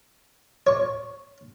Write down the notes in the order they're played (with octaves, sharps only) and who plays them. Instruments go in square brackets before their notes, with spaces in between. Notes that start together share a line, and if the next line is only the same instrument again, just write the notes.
[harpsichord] C#5 C#6